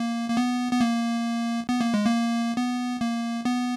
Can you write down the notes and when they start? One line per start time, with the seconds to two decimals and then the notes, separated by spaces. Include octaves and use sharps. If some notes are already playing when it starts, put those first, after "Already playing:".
Already playing: A#3
0.30 A#3
0.37 B3
0.73 B3
0.81 A#3
1.69 B3
1.81 A#3
1.94 G#3
2.06 A#3
2.57 B3
3.01 A#3
3.45 B3